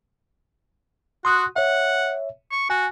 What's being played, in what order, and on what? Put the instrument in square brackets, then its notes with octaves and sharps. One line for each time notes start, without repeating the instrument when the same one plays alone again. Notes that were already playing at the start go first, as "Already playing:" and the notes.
[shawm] F#4 [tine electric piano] C6 D#6 F#6
[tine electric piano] C#5 E5 [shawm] F#5
[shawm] C#6
[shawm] F#4 [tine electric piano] G#5